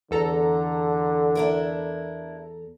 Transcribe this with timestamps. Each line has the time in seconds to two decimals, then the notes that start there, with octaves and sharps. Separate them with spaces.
0.11 E2 D3 A4 A#5
1.35 D4 E4 A#4